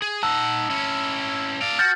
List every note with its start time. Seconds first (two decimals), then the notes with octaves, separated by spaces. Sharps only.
0.02 G#4
0.23 D#4 F#5 A5 E6
0.70 C#4 E4
1.62 D5 F5
1.79 F#4 F6 G6 A6